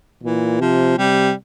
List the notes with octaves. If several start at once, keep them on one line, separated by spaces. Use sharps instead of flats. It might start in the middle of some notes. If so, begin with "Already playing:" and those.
A#2 E3
C3 F3
C3 G3